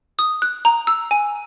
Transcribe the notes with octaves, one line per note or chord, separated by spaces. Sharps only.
D#6
F#6
A#5
E6
G#5